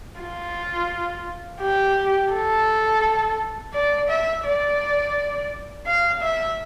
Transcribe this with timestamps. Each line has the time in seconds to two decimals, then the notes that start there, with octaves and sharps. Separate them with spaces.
0.21 F4
1.61 G4
2.33 A4
3.74 D5
4.09 E5
4.45 D5
5.86 F5
6.21 E5